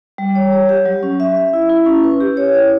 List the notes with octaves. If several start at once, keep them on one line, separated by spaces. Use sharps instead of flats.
G3
C#5
G4
G4
F#3
C#4
E5
E5
E4
E4
C#4
B4
G4
C#5
E4